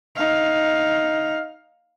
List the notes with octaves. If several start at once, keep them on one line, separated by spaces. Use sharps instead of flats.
D#4 F5